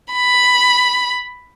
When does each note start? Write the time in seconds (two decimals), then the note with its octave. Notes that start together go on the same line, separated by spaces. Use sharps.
0.13 B5